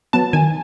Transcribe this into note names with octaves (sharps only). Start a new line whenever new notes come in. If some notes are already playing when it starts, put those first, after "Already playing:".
F#3 B3 A5
D#3 G#5